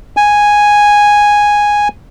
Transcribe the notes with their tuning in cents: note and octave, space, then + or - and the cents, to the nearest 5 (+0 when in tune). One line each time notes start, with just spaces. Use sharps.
G#5 -5